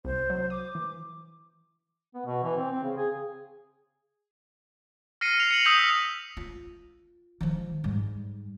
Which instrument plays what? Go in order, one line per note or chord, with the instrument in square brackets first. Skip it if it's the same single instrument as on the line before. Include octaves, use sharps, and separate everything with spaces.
[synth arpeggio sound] C2 [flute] C5
[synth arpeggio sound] F#3
[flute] D6 [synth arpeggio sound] D#6
[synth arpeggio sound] E3
[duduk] B3
B2
E3
C4
C4
C#3
G#4
[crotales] F6 A#6 C7 C#7 D#7
C7 F7
C#7 F7 F#7
D#6 E6 G6 B6 C#7 F#7
B6
[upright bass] F4
D#3 F3
G#2 G3